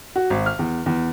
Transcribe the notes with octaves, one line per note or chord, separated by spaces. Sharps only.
F#4
G#1
F6
E2
E2